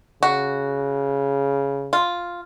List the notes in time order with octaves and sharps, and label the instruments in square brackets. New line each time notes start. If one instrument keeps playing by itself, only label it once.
[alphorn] C#3 [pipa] F#4
[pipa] F4